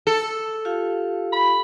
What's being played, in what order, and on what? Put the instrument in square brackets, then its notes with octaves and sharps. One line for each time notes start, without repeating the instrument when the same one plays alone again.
[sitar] A4
[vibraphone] F4 G4 F5
[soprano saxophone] B5